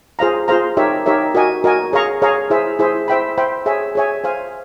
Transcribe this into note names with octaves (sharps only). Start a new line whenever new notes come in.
F4 G#4 C5 F5 A#5
F4 G#4 C5 F5 A#5
D#4 G4 A#4 C#5 E5
D#4 G4 A#4 C#5 E5
F#4 A#4 D#5 G#5
F#4 A#4 D#5 G#5
G#4 C#5 F5 A#5 C#6
G#4 C#5 F5 A#5 C#6
E4 G#4 C5 E5
E4 G#4 C5 E5
C5 E5 G5 B5
C5 E5 G5 B5
G#4 C#5 E5 G#5
G#4 C#5 E5 G#5
C5 F5 G#5